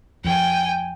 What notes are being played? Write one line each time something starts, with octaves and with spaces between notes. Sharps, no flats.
F2 G5 G#5